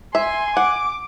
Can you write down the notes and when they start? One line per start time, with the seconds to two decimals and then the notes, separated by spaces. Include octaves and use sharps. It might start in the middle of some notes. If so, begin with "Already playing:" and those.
0.15 E5 G#5 C6
0.57 F#5 D6